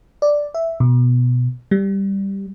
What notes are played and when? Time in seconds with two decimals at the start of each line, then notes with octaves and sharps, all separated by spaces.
0.22 D5
0.54 E5
0.80 B2
1.71 G3